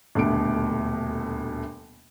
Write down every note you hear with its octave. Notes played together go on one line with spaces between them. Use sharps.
D#1 D2 B2 A3 D7